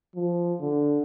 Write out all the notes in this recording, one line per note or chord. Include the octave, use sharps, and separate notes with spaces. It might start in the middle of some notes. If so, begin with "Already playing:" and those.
F3
D3